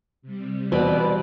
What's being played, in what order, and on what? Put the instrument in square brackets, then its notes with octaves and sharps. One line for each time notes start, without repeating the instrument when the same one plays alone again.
[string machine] C3 G3
[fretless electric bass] E2 [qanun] B2 C4 B5 [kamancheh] B4 D5